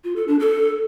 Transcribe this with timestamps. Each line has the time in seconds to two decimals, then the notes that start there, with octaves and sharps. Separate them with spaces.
0.04 F4
0.16 A4
0.28 D4
0.40 A4